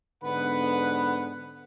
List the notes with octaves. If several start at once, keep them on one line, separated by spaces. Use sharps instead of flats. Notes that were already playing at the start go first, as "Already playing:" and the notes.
G#2 D3 B3 B4 F#5 B5